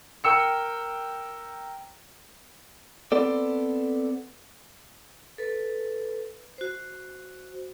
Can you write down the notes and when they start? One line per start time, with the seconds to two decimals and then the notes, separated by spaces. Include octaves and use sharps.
0.24 A#4 G5 E6 C#7
3.12 B3 C4 A4 D5
5.38 A4 B4
6.58 F#4 C5